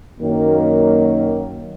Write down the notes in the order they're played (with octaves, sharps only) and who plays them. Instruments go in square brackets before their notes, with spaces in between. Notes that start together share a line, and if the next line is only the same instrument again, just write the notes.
[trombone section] F#2 D#3 F#3 A#3